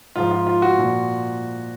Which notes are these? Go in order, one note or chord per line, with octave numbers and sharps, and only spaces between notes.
G#2 F3 F4
F4
F4
F#4
A#2 F3